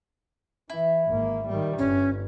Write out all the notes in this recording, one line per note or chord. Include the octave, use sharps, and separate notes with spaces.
E3 E4
G#1 A#3
D#3 G3
G1 C#4